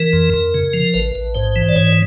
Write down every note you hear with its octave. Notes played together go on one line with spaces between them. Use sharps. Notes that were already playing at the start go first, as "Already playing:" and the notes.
Already playing: E3 A#4
F2
F2
C#3
F3
A1 B4
A1
G#2 C5
E3
D5
G#2 C#5